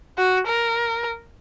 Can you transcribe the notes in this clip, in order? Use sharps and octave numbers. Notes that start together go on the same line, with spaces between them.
F#4
A#4